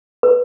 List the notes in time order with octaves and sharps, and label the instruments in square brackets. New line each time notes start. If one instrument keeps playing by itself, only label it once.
[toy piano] B4